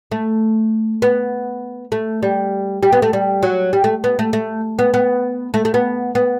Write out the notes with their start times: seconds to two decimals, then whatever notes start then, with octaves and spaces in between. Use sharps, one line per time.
0.11 A3
1.02 B3
1.92 A3
2.23 G3
2.83 G3
2.92 B3
3.02 A3
3.13 G3
3.43 F#3
3.73 G3
3.84 A3
4.04 B3
4.19 A3
4.33 A3
4.79 B3
4.94 B3
5.54 A3
5.65 A3
5.74 B3
6.15 B3